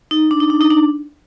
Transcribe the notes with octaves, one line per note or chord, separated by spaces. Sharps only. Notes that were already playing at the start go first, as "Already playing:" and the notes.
D#4
D4
D#4
D4
D#4
D4